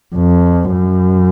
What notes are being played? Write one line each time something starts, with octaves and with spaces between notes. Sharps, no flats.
F2
F#2